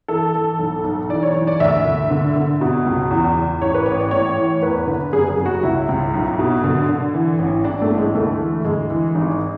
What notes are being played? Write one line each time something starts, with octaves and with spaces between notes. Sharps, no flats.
E3 A4
E3
B1
B1
E3 D5
C#5
E3 C#5
D5
D2 E5
D2
D3
D3
B2
C#2
E2
E2
A1 C#5
B4
A1 C#5
D5
A2 C#5
E3
E2 B4
D3
F#1 G#4
G#4
F#1
F#4
C#2 E4
C#2
B1
B2
D3
D3
E3
A1
A1 D4
A3
A1
G#3
D2 A3
E3
D2 G#3
E3
G#1